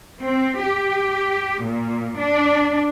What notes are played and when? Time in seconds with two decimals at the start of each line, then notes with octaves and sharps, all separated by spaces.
0.21 C4
0.62 G4
1.64 A#2
2.19 D4